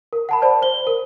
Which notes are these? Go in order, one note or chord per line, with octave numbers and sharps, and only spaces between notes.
A#4
F#5 A5 B5
C5 D5 A5
C5 G7
A#4